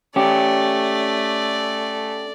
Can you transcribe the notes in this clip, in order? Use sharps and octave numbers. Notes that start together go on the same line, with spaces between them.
A3 C#4 G4 D5